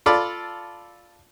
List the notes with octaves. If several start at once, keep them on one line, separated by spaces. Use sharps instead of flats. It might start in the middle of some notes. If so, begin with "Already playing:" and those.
F4 A4 D5 B5 D6